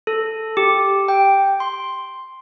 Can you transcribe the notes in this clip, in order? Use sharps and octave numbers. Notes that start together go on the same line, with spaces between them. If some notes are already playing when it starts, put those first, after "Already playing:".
A4
G4
G5
C6